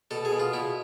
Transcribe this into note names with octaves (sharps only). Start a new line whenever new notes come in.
B2 A4
G#4
B2
F4
B2 E4